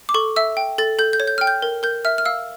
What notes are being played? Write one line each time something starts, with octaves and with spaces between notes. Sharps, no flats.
D6
A4 C#6
E5 E6
G5
A4 A6
A4 G6
G6
C#5
G6
G5 F6
G6
A#4
A#4 G6
E5 F6
F6
F5 E6